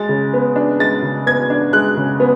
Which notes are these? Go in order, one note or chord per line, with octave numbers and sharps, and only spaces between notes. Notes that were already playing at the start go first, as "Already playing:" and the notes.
Already playing: G#3 A6
C#3
B3
D4
G#3 A6
C#3
B3 G#6
D4
G#3 F#6
C#3
B3